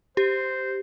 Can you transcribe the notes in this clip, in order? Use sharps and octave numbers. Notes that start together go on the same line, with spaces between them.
G4 C5